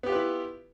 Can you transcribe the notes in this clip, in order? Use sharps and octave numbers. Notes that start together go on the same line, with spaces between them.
B3 E4 F4 G4 B4